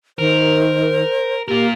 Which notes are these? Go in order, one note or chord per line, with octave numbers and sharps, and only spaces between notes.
D#3 A#4 C5
A#3 F4 G4 A#4